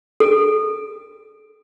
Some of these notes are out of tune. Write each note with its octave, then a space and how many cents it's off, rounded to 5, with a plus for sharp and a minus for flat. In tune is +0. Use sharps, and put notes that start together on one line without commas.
A4 -40